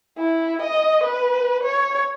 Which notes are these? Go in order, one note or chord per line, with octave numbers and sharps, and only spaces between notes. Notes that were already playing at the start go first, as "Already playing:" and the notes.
E4
D#5
B4
C#5